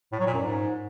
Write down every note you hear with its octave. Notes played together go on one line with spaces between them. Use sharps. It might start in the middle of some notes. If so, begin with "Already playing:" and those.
A2
F#3
A#2
F#2
G#2